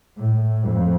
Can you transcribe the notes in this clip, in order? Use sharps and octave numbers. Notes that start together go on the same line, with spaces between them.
A2
F2